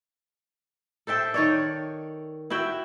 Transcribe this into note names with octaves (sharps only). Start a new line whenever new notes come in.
A4 C5 E5 G5
D#3 C#5 D5
E4 F#4 E5 G5